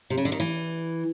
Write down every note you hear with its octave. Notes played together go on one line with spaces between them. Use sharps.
C3
C#3
D3
D#3
E3